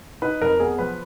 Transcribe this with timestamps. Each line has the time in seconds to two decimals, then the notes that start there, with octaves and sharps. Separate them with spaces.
0.22 D#4 B4
0.41 F2 A#4
0.60 B3 G#4
0.79 F3 B4